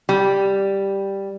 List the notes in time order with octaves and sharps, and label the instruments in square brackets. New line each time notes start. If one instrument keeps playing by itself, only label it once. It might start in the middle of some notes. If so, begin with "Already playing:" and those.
[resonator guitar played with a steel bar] G3